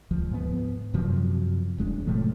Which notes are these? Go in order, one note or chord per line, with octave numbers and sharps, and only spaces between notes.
D2 F3
G#2 B3
F#2 C3 F3 F#3
E1 G#3 C#4 D4
A2 C3 F3 A3